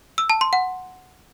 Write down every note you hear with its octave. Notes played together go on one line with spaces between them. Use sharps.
E6
A5
C6
F#5